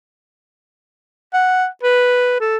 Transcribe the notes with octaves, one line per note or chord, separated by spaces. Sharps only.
F#5
B4
A4